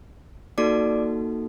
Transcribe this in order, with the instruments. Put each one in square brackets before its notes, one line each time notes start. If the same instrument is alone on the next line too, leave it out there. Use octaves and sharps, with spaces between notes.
[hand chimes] A#3 D#4 F#4 A4 D5 D6